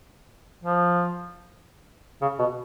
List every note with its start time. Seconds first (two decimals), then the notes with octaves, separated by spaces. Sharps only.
0.64 F3
2.22 C#3
2.39 B2